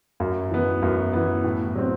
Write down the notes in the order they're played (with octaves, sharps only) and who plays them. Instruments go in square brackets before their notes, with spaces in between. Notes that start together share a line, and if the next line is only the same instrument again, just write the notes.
[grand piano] F#2
E3 B3
F#2
E3 B3
A2
F#3 C4